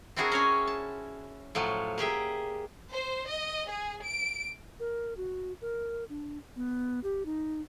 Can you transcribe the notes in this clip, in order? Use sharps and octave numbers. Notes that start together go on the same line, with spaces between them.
C4 D4 E4 F#4 G#4 A#4
C#4 C#5 G#5
A5
A2 F3 F#3
A#3 G4 G#4 E5
C5
D#5
G#4
D7
A#4
F#4
A#4
D4
B3
G4
D#4